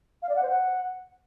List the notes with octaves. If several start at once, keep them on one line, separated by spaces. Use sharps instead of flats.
F5
D5
F#5
C5
F#5